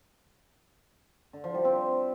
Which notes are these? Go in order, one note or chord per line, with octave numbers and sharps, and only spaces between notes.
D3
F3
G3
C4